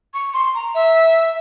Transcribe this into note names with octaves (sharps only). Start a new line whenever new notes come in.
C#6
C6
A#5
E5